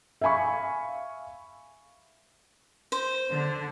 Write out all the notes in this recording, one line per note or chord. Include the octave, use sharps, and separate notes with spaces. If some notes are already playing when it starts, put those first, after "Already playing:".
E5 F5 G#5 B5 C#6
C5
D3